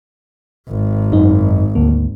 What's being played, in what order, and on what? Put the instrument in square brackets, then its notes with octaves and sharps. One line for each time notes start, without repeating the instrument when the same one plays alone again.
[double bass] G#1
[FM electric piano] F#2 D#4
D2 A#3